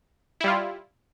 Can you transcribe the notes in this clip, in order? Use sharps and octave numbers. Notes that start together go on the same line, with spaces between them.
G3 E4 F4